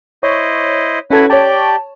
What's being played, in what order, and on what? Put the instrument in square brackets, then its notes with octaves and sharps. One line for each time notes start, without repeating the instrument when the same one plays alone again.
[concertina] E4 C5 D#5 [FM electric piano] C#5
[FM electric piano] C#4 A4 G#6 [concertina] E4 F#4 B4
[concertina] G4 D5 G5 [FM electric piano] C#5 A5